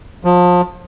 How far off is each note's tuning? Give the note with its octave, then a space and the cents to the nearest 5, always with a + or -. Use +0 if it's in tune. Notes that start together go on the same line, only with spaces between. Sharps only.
F3 +30